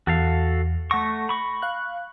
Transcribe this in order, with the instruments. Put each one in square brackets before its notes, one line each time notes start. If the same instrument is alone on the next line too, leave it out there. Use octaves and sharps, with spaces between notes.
[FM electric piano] E2 [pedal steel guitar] F#4 A4 F5
[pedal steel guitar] A3 C#6 [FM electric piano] F#5 A#6
[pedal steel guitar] B5 C#6
[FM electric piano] F5 F#6